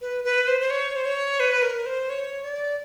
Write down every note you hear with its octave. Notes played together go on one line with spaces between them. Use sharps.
B4
B4
C5
C5
C#5
C5
C#5
B4
A#4
C5
C#5
D5